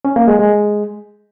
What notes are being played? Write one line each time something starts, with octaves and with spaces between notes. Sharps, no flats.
C#4
A#3
G#3
G#3